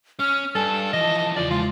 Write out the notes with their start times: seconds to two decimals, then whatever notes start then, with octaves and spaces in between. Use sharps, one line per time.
0.20 C#4 F6
0.55 G2 A4 G#5 A5
0.93 E3 F3 D#5
1.37 E2 C#3 F4 D5
1.51 G#3 F4